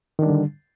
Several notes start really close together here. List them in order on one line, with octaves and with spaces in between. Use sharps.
D#3 D4 G3 D3